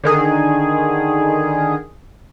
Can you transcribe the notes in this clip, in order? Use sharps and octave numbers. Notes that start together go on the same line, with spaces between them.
D3 D#3 G#4